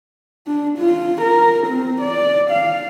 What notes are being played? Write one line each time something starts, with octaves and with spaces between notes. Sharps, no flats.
D4
F4
A#4
C4
D5
F5